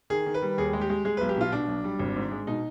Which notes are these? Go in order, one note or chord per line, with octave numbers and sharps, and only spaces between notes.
D#3 G#4
D#3
B4
G3
D#2 G#4
G#3
G4
G#3
G#3 G#4
B1 B4
G4
B2 F4
B2 D4
B1
G3
G#1
G#2
G#3
B2 D#4